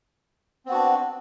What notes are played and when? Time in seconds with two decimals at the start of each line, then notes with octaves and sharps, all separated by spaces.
0.66 C4
0.69 B3
0.71 F#4
0.74 D4